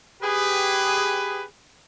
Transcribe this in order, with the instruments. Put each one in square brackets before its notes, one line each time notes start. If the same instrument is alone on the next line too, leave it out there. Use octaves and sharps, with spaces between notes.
[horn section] G4 G#4 B4